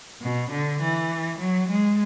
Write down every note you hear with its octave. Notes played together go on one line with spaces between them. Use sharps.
B2
D3
E3
F#3
G#3